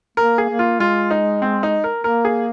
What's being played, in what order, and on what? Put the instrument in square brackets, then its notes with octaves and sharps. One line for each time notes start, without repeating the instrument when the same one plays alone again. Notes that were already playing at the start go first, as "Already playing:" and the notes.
[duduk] A#3 [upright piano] A#4
[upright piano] G#4
[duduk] A#3
[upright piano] F4
[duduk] G#3 [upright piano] F4
[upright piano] D#4
C4
D#4
A#4
[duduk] A#3 [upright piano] A#4
[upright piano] G#4